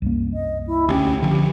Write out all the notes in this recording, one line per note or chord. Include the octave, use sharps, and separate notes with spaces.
C2 F#2 A#3
D#5
E4
D2 C#4 G4
D3 F3